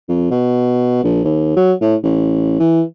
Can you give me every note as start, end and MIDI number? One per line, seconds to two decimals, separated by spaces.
0.09 0.29 41
0.31 1.02 47
1.04 1.20 34
1.24 1.56 39
1.56 1.73 54
1.81 1.95 45
2.03 2.55 33
2.60 2.82 52